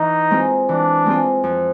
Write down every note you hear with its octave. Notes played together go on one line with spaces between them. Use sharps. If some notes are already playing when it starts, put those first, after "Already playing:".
Already playing: E3 D#4
G#3 C4 F4
E3 D4
G#3 C4 F4
F2